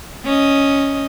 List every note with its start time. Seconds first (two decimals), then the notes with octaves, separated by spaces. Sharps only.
0.25 C#4 D#5